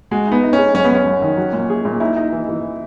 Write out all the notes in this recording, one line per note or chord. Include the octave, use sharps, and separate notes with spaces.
G#3 F#4
B3 D#4
D#4
C#4
G#3
F#2 C#4
B3
F#2 C#4
F#2
D#3
F#3
A#2
G#4
A#2
D#4 E4
D#4
E3
E3